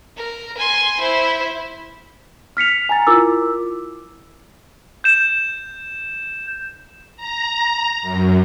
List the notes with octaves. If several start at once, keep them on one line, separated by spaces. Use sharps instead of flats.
A#4
G#5 C6
E4 C5
F6 B6 C#7 F7
G#5 A#5 A6
E4 F4 A#4 D6 E6
G6 E7
A#5
F#2